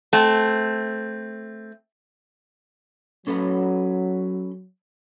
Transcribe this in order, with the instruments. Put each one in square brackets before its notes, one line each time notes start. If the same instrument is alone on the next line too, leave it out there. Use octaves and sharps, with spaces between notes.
[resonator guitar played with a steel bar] A3 C4
[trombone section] F#3 [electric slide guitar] C#4 A4 B4